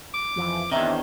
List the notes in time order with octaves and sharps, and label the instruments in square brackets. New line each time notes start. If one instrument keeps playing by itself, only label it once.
[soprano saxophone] D6
[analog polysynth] F2 E3 F3
[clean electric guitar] E2 D#3 [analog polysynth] C4 D4 C#5 [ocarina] E5 [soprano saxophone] A#5